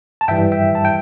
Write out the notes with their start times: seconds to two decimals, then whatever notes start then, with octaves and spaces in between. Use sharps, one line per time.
0.21 A5
0.28 G2 E3 G3 E5 G5
0.52 E5 G5
0.75 A5
0.85 G5